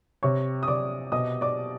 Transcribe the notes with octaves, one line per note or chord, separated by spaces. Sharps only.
C3 C#5 C#6
D#6
C3 D5 D6
B2 D#5 D#6
D5 D6